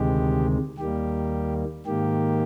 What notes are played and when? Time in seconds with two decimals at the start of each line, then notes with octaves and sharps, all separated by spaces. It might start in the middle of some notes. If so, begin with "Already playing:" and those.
Already playing: D2 C3 D#3 G#3 G4
0.78 D#2 D#3 G3 A#3 G4
1.86 G#2 D#3 A#3 G4